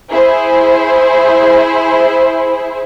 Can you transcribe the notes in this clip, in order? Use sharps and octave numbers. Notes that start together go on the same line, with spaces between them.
E4 G#4 C5